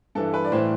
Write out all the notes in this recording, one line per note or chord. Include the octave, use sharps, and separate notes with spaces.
G2 E3 A4
B4
D5
A2 E3 C5